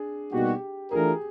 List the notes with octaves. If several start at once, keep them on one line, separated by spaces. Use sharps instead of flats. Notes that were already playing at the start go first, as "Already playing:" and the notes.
Already playing: D4 G#4
B2 G3 A#3 D#4 F#4 G4
E3 A3 D4 F4 G#4 A#4